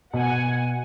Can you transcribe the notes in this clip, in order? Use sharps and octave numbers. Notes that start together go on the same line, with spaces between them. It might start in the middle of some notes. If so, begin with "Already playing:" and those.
B2 F#5 G#5